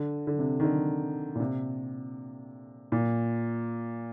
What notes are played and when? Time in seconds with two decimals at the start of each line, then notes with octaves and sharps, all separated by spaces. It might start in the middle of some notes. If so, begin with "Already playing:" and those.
Already playing: D3
0.27 D3
0.39 C3
0.60 D#3
0.64 D3
1.35 A#2
1.40 C3
2.92 A#2